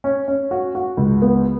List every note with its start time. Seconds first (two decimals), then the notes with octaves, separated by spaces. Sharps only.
0.04 C#4
0.28 C#4
0.51 F#4
0.75 F#4
0.97 C#2
1.22 B3